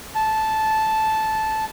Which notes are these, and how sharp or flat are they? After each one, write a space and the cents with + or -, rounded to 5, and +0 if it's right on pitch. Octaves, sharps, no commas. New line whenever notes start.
A5 -10